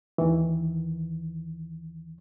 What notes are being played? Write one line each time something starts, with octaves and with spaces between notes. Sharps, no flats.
D#2 D#3 E3